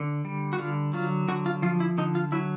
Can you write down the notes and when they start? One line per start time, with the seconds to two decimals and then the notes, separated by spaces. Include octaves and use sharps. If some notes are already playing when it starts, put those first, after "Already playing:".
Already playing: D3
0.25 G3
0.53 F#4
0.59 D3 F4
0.93 F#3 F4
1.28 D3 F#4
1.46 F4
1.62 F3 F4
1.80 E4
1.98 D3 D#4
2.15 F4
2.32 F#3 E4